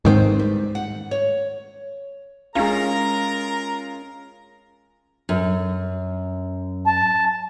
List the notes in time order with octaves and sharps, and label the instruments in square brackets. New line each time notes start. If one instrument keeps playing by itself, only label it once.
[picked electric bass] G#2 D#3 [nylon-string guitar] B3 C4 C5
[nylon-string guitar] G3
F#5
C#5
[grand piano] G#3 F4 [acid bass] C#4 [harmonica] A#4 A#5
[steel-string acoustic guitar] F#2
[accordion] A5